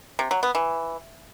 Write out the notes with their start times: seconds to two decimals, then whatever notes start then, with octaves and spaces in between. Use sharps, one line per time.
0.19 C3
0.31 F#3
0.43 B3
0.55 E3